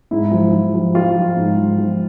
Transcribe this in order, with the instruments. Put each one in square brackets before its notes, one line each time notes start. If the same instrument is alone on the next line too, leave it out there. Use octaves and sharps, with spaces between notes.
[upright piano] G#2 E4
F3
F3
F3
F3 F4
F3
G#2
F3
F3